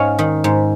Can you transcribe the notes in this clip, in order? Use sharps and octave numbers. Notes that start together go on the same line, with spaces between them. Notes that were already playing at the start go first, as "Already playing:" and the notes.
Already playing: G#2 C#4 C#5 D#5 F5
D#3
G#2